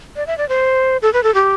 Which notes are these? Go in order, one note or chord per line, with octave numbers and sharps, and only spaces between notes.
D5
E5
D5
C5
A4
B4
A4
G4